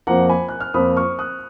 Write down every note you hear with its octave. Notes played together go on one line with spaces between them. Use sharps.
F2 F3 A#3 F#5 A#5
G#5 B5
F#6
F6
F2 F3 A#3 B5 D#6
C#6 F6
D#6 F#6